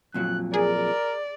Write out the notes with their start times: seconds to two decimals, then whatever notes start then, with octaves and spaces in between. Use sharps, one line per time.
0.14 F2 A#2 F#3 F#6
0.54 G#4 A#4 D5